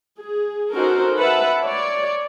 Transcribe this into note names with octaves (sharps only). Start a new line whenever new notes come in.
G#4
C#4 D#4 F#4 A4 A#4 C5
B4 E5 F#5 A5 B5
C#5 D5